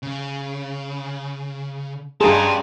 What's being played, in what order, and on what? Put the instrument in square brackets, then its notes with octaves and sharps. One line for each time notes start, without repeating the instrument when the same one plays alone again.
[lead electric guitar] C#3
[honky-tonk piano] G2 A#5 C6 [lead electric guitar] C#4 [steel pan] G#4 [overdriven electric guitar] G5 A5